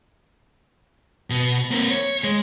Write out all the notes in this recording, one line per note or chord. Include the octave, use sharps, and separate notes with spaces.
B2
A#3 C4
C#5
G#3